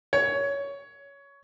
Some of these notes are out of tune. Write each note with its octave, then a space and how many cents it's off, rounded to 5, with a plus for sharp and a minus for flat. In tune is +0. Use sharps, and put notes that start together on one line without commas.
C#5 +15